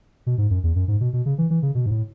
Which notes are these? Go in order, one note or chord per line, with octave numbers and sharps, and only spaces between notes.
B2
G#2
F#2
E2
F#2
G#2
B2
B2
C#3
E3
E3
C#3
B2
G#2
A2